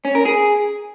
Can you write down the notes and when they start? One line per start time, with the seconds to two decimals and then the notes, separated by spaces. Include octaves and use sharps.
0.05 C#4
0.15 A#4
0.25 G#4